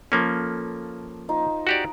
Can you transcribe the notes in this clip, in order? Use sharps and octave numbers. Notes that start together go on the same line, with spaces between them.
F3 A#3 C#4 A4
D#4 F4 C5
F#4 G4 D5